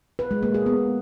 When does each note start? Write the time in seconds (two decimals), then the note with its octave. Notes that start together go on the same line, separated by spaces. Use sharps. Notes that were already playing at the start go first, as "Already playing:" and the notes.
0.19 B4
0.31 G#3
0.43 A#3
0.54 G#4
0.66 B3